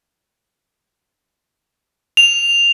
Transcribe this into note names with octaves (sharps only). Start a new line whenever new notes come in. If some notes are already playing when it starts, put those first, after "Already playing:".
F7